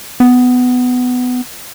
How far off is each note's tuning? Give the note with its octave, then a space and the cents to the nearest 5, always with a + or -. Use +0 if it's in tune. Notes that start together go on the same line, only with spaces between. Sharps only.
B3 +15